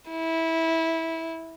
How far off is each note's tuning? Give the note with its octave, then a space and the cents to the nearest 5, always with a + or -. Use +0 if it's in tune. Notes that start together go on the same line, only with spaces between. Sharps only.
E4 -15